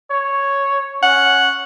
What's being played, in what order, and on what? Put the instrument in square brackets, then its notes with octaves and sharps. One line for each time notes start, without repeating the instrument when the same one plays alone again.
[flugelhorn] C#5
[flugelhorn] C#4 [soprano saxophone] F#5